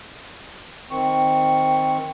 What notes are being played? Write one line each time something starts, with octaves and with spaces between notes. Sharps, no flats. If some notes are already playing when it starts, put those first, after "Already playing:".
D#3 C4 C#6